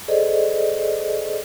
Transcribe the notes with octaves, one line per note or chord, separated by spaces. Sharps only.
G#4 A4 C5 D5 D#5